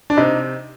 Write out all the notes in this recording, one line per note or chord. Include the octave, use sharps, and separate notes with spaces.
D4
C3 D#4